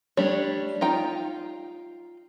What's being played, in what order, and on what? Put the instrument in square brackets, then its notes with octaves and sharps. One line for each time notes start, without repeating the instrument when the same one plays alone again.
[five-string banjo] G3 A3 D4 G4 C#5
D#4 F4 G5